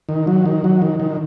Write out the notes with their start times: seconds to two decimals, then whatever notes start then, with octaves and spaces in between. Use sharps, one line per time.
0.09 D#3
0.27 F#3
0.46 D#3
0.64 F#3
0.82 D#3
1.00 D#3